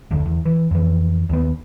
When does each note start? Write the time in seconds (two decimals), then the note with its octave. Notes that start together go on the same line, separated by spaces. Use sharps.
0.11 F1 D2 D3
0.26 E2
0.45 E3
0.71 F2 E3
1.29 D#2 B3